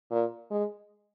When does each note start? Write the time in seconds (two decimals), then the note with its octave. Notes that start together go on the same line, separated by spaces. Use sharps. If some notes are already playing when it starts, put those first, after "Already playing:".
0.11 A#2
0.51 G#3